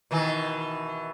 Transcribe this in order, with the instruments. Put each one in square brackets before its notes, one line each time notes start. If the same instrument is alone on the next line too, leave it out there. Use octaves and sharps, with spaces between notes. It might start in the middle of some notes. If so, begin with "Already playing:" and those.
[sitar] B2 D#3 E3